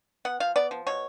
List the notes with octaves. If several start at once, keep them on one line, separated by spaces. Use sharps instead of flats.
B3 F#5
F3 F5
B3 D5
F3
B2 C#5